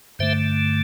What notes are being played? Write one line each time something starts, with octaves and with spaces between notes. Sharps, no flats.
G2 D3 A3 C5 E5